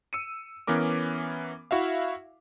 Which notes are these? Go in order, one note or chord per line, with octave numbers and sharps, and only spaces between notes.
E6 C#7 D#7
E3 B3 C#4 A#4 D6
E4 F#4 E5 F5